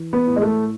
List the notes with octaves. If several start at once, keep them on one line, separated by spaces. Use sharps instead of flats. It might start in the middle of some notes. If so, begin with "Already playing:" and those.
Already playing: E3
B3
A2
G#3
A3